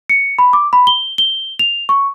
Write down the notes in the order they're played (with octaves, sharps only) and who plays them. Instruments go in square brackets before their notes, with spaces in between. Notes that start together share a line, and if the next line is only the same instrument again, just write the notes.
[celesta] C#7
B5
D6
B5
G7
G7
F7
C#6